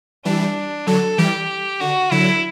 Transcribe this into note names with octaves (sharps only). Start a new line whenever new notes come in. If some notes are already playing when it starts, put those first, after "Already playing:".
E3 G3 D4
D3 F#3 A4
E3 G3 G4
D3 F#4
D3 F#3 E4